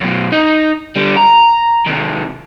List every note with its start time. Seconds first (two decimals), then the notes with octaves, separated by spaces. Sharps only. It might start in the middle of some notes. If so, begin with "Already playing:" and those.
0.01 F#2 B2
0.32 D#4
0.96 D3 G3
1.17 A#5
1.86 C3 D#3